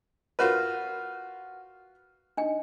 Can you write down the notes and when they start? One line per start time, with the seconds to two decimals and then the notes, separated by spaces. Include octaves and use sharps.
0.39 F4 F#4 A#4 B4 C#5 F#5 B5 F6
2.37 D4 D#4 D#5 G#5